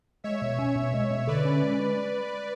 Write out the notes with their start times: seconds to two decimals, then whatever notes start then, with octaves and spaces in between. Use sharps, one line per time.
0.24 G#3 C#5 E5
0.42 B2
0.59 C#4
0.76 B2
0.94 G#3
1.11 B2
1.28 D3 B4 D5
1.45 C#4
1.62 G#3